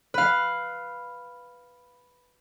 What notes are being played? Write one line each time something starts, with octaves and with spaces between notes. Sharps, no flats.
B4 F5